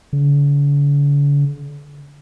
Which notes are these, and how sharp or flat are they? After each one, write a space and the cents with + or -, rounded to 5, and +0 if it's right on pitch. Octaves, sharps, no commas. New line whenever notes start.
D3 -45